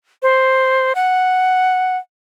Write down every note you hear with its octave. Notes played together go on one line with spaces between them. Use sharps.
C5
F#5